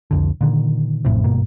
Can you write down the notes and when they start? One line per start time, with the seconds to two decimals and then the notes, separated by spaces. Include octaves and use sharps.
0.11 C2 F2 D3
0.41 A#2 D3 D#3
1.05 A1 F2 A2 C3
1.24 G#1 G2 B2 A#3